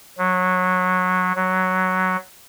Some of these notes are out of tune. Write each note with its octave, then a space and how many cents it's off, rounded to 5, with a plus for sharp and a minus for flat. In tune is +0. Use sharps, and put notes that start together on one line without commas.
F#3 -15
F#3 +5